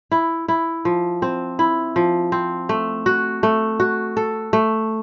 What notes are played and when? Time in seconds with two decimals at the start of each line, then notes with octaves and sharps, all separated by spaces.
0.12 E4
0.48 E4
0.85 F3
1.22 C4
1.59 E4
1.96 F3
2.32 C4
2.69 A3
3.06 F#4
3.43 A3
3.80 F#4
4.17 A4
4.53 A3